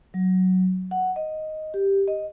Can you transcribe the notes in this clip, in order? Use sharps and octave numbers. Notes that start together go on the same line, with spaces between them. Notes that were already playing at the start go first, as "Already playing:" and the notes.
F#3
F#5
D#5
G4
D#5